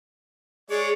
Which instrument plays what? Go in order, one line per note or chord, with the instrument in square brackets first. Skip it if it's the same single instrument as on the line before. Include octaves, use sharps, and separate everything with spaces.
[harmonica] G#3 C#5 D5 [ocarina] G#4